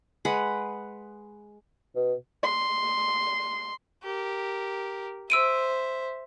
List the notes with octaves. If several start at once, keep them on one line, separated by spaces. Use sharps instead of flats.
G#3 B4 F#5
B2
C6
G4 A#4
C5 E5 E6 D7 D#7